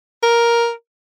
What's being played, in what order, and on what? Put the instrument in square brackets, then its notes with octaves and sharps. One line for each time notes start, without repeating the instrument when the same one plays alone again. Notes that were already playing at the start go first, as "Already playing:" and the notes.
[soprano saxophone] A#4